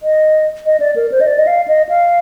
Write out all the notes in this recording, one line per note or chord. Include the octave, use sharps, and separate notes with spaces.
D#5
D#5
D5
A#4
C5
D#5
D5
D#5
F5
D#5
F5